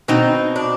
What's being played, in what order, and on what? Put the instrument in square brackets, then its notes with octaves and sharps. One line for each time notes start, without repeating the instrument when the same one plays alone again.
[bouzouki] B2 [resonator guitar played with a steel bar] C4 D#4
[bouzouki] D4